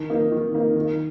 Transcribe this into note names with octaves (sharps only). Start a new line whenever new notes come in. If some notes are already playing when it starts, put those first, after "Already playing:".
Already playing: D#3
A#3 D#4
D#3
A#3 D#4
D#3